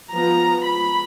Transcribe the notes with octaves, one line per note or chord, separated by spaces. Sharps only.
F3 B3 A#5
B5